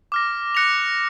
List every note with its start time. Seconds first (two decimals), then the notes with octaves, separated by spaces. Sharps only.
0.12 D6 F6 A#6
0.55 F#6 A#6 C#7 F7